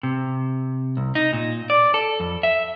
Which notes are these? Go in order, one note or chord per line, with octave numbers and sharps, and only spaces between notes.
C3
C2
D#4
A#2
D5
A4
F2
E5